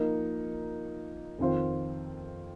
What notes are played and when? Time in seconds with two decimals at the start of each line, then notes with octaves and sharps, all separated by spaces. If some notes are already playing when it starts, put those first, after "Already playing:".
Already playing: F3 A#3 D#4 A#4
1.39 F2 D#3 C4 F4 C5